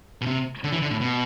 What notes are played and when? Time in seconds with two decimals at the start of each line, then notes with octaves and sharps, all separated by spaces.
0.21 B2
0.26 C3
0.64 D3
0.72 E3
0.82 D3
0.91 A2
1.01 B2